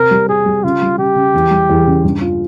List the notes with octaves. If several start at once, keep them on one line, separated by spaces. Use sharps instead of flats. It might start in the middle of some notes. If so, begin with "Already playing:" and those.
Already playing: C3 C4 A#4
G3
G4 G#4
G3
C#3 F4
G3
C#3 G4
C#3
E2
G3
E2
C#3
G2
F4